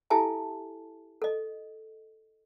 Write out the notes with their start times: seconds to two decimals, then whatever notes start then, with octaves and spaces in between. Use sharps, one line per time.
0.10 E4 G4 A4 E5 G#5 A5
1.22 A4 D#5